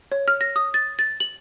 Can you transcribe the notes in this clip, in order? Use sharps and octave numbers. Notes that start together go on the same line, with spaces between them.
C#5
F6
A#6
D#6
A6
A6
F#7